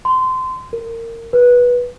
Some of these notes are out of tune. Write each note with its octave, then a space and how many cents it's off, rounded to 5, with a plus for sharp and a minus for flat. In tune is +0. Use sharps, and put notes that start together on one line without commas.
C6 -25
A#4 -20
B4 -15